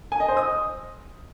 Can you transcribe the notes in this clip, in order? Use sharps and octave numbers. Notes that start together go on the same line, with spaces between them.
G#5
D#5
C5
D#6